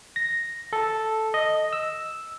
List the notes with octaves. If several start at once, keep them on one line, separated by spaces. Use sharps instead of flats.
A#6
A4
D#5
E6